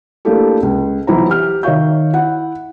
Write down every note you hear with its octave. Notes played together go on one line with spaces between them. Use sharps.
A3 A#3 D4 E4 G4 A4
C#2
B1 E3 E4 C5 A#5
G4 F6
D#3 C#5 E5 F5 C#6 G6
E4 F#5